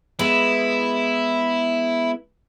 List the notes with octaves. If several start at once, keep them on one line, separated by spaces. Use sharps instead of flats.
G#3 B3 E4 G#4